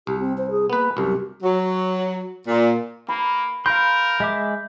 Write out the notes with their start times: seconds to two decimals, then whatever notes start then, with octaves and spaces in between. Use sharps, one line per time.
0.07 C2 G4
0.19 C4
0.37 C5
0.50 G#4
0.70 A#3 B3 B4
0.97 C2 F#2 G4
1.43 F#3
2.48 A#2
3.08 A#3 B5
3.66 A#4 F5 B5 C6 G6
4.20 G#3 E5 D6